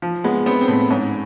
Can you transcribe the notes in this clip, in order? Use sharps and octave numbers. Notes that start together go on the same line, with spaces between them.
F3
G#3 B3
B3 C4
C4
A2
G#2 C#4